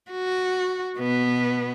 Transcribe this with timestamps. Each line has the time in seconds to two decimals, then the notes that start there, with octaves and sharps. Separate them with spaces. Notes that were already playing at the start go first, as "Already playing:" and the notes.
0.11 F#4
0.97 B2 B3